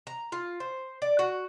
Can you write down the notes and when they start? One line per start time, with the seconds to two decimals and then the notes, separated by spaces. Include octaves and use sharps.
0.07 A#5
0.32 F4
0.60 C5
1.02 D5
1.19 F#4